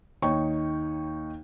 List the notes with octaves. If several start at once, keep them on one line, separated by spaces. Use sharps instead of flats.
D#2 D#4 C#5 G5 C#6